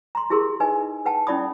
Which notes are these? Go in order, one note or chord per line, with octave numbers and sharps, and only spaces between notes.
A#5 C6
E4 G4 G#4 A#4 C6
D#4 B4 D#5 G#5
B4 F#5 G5 A5
C#4 E4 D5 B5 D#6